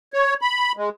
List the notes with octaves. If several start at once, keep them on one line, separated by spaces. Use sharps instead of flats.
C#5
B5
G#3